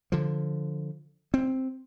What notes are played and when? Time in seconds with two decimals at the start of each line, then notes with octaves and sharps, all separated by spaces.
0.12 D3 F3
1.34 C4